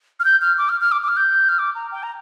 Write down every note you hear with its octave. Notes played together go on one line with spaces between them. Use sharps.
F6
G6
F6
D6
F6
F6
D6
D6
F6
G6
F6
D6
A#5
G5
A#5